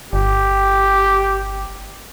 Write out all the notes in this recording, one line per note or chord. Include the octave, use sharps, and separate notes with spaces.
G1 G4